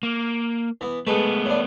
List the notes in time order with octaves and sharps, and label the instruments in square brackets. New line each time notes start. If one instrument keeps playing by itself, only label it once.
[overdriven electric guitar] A#3
[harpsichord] E3 B3
[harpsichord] G#3 A4 B4 [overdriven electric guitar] A3 B3
[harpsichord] A2 D4